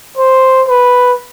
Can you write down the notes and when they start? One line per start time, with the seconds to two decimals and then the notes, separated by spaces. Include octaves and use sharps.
0.17 C5
0.68 B4